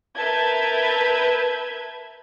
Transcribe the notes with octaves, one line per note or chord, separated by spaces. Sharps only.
A#4 B4 E5 A5 G6 G#6